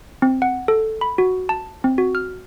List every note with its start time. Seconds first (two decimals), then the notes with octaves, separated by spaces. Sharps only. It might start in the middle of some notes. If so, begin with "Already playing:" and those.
0.22 C4
0.42 F#5
0.68 A4
1.01 B5
1.18 F#4
1.49 A5
1.84 C4
1.98 F#4
2.15 F6